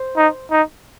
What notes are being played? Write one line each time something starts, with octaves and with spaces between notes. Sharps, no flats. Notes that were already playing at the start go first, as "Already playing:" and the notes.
Already playing: C5
D#4
D#4